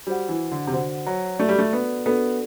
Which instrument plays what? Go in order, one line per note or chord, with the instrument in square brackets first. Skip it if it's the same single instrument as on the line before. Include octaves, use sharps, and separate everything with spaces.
[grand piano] G3 [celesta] F#4 C5 F#5
[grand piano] E3
D3
C3
[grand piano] D3 [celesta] F#4 C5 F#5
[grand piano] F#3
[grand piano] A3 [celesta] D4 F#4 A4 D5
[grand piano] G3
A3
B3
[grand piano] B3 [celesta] D4 F#4 A4 D5